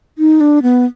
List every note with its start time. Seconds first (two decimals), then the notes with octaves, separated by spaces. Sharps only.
0.18 D#4
0.41 D4
0.62 B3